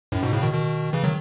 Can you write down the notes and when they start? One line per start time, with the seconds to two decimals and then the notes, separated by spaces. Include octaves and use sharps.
0.12 F#2 A2
0.22 G#2 B2
0.33 A2 C#3
0.43 B2 D#3
0.53 B2 D#3
0.93 C#3 E3
1.04 D#3 F#3